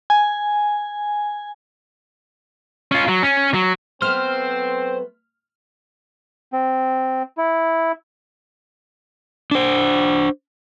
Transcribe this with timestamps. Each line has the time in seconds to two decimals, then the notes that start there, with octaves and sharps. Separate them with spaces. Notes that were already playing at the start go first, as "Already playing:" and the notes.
0.10 G#5
2.92 C#4 F4
3.08 F#3
3.23 C#4
3.54 F#3
4.02 F#3 A3 B3 C4 C5 F6
6.53 C4
7.38 E4
9.51 D4 C5